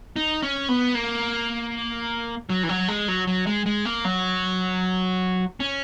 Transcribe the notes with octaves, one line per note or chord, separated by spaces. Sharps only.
D#4
C#4
B3
A#3
F#3
E3
F#3
G#3
F#3
F#3
G#3
G#3
A#3
F#3
C#4